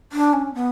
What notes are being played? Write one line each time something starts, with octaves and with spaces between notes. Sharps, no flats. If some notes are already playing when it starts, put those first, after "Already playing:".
D4
C#4
B3